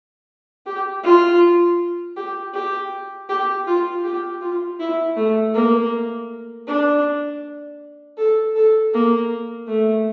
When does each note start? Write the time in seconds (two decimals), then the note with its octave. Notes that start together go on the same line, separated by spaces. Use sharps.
0.66 G4
1.04 F4
2.17 G4
2.54 G4
3.29 G4
3.67 F4
4.04 G4
4.42 F4
4.80 E4
5.16 A3
5.54 A#3
6.67 D4
8.18 A4
8.56 A4
8.93 A#3
9.68 A3